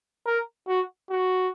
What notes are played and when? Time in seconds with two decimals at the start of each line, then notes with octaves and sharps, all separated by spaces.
0.26 A#4
0.68 F#4
1.10 F#4